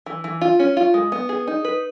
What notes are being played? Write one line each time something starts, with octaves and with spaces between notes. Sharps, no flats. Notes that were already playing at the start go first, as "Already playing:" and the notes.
E3
E3
F4
C#4
F4
G#3
B3
G#4
D#4
B4